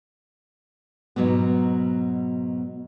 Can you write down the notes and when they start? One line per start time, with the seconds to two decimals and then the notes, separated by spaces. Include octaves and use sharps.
1.16 G#2 B2 F#3 A#3 B3